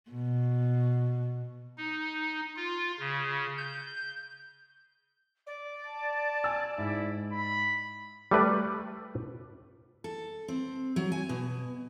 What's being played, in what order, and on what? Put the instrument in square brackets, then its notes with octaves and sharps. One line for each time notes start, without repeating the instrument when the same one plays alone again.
[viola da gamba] B2
[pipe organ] D#4
F4
C#3
G6
[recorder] D5
[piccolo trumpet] A5
[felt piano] G#5 E6
[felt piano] G#2 [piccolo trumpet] E4
[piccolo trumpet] B5
[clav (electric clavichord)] G3 A3 B4 D5
[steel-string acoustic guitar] A4
C4
F#3
G#5
B2